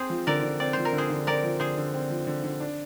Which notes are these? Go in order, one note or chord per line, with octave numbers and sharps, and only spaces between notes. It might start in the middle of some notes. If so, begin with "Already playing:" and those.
Already playing: C4 G#4 C5
F3
D3 A#4 D5
D3
C4 D5
F3 C5
A#4
D3
G#4 C5
D3
C4 A#4 D5
F3
D3 G#4 C5
D3
C4
F3
D3
D3
D4